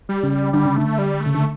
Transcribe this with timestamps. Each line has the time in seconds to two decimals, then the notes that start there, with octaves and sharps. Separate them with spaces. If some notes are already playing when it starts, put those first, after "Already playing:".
0.09 G3
0.23 C#3
0.53 D3 G3
0.65 C#3
0.76 D3 A3
0.98 G3
1.21 A3
1.26 C#3
1.35 D3